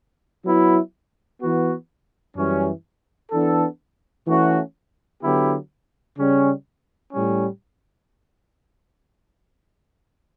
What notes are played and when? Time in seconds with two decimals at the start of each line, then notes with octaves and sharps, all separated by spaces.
0.45 F#3 B3 E4
1.41 E3 B3 F#4
2.36 F#2 E3 G3 C#4
3.31 E3 B3 D4 A4
4.27 E3 A3 C#4 F#4
5.22 D3 F#3 B3 E4 G4
6.18 C#3 G3 C#4
7.13 A2 G3 C#4